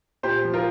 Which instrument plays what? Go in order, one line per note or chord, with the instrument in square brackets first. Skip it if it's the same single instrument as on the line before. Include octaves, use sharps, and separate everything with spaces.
[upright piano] A#2 G4 C5
F3
F4 A#4